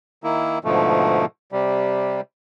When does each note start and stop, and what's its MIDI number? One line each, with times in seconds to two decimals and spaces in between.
0.24 0.59 51
0.24 0.59 58
0.24 0.59 64
0.64 1.25 44
0.64 1.25 47
0.64 1.25 50
0.64 1.25 53
0.64 1.25 57
1.52 2.21 48
1.52 2.21 55